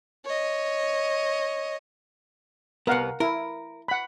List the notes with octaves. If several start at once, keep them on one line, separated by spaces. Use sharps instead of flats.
C#5 D#5
C2 B3 A#4 F5 F#5
E4 A#4
F#5 B5